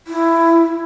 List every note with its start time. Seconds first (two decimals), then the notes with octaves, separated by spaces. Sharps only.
0.07 E4